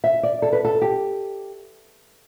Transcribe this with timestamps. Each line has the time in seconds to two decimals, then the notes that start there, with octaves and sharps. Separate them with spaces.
0.04 E5
0.23 D5
0.42 A4
0.53 B4
0.65 A4
0.82 G4